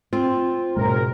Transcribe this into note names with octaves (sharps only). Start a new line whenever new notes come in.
C4 F4
F#1 G#2 B2 G#3 A#4